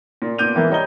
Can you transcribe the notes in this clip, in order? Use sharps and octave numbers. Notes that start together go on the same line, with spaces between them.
A#2
A#2 B3 D6 G6 D#7 F7
G#2 E3 A#3
G3 C#5 D#5 A#5 D#6 G7